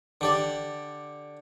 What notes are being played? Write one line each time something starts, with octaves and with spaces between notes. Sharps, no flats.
D3 G4 D5